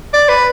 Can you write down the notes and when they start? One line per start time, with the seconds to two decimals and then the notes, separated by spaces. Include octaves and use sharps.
0.13 D5
0.29 B4